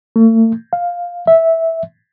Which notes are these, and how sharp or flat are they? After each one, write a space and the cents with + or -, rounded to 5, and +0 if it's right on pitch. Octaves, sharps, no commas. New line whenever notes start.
A3 +40
F5 +5
E5 -10